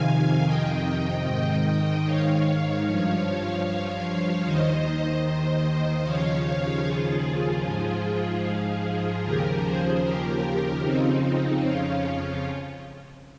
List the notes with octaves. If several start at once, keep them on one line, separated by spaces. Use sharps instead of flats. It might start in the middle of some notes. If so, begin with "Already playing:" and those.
Already playing: F2 C3 D#3 F5 G#5
D#5 G5
G#2 D#3 D#5 G5
C#5 F5
G2 F3 C#5 F5
C#5 F5
D#2 D#3 C5 D#5
C5 D#5
D#2 C#3 F3 C#5 F5
F4 G#4
G#2 F3
D#2 C#3 F3 G4 A#4
G#4 C5
G4 A#4
F2 C#3 F3 C4 D#4
C4 D#4
C#4 F4